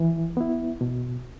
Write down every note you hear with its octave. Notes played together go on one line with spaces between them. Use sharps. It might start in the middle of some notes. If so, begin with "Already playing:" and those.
Already playing: E3
B3 E4
B2